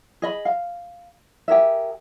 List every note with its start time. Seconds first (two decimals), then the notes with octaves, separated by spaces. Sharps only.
0.22 G#4 D#5 B5
0.45 F5
1.48 G4 G#4 A#4 E5